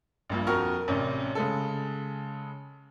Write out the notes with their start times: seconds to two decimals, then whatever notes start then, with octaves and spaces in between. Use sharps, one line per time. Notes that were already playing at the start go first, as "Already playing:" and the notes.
0.30 A#1 G2 A#2
0.47 F2 F#4 A#4 C#6 F6
0.88 A1 C3 C#4 D5
1.35 C#3 G#3 A4